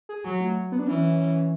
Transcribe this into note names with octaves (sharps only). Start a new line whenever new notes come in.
G#4
F#3 F#4
A3
B3
D4
E3 C#4